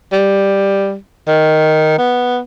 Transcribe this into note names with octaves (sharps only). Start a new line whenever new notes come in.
G3
D#3
B3